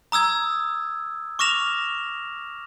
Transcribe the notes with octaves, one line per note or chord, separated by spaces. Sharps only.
A#5 D#6 E6 G#6
C#6 D6 F6 A#6 E7 F7